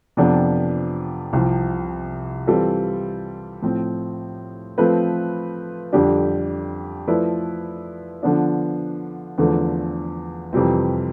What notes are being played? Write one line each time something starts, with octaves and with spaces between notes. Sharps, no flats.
F2 C3 F3 B3 D4
C2 C3 F3
E3 G3 C4 F4 A4
A2 F3 C4
F3 A3 C4 F4 B4
F2 D3 G3 D4 G4
F3 A3 E4 B4 D5
D3 F3 B3 D4
E2 D3 F3 A3
F2 C3 E3 G3 C4